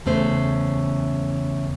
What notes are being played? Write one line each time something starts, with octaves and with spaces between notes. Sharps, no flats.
E2 C#3 A3 C5